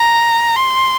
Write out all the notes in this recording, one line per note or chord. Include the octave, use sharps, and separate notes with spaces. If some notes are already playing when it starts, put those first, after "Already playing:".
Already playing: A#5
C6